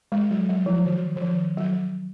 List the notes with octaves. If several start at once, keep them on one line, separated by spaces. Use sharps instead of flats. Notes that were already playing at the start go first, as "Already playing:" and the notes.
G#3
F#3
F#3
F3
D#3
D#3
F3
F#3